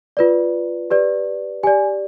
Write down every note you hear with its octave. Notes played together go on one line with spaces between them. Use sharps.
F4 B4 D5
G4 B4 D5
G4 D5 G#5